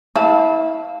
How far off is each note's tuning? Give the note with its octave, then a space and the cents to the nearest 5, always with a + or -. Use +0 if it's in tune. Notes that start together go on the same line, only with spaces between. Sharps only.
E4 -30 F5 +0 A5 +0